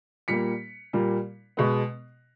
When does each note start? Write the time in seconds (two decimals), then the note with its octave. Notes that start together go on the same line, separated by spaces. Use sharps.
0.28 A#2 G3 A#3 B6 C#7
0.93 A#2 G3 A#3
1.57 B2 G#3 B3